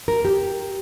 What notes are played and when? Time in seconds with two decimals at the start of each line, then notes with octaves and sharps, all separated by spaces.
0.08 A#4
0.25 G4